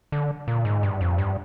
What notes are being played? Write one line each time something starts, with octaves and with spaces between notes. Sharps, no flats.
D3
A#2
G#2
G2
F2
G2